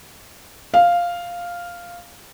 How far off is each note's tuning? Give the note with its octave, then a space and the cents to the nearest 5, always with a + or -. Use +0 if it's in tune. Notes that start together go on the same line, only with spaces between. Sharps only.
F5 +0